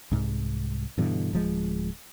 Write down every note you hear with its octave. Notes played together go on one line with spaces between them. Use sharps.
C2 G#2
G2 B2 D3 E3
D1 F3 G#3